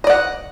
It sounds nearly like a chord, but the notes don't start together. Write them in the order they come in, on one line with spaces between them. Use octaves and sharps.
D#5 D5 F#5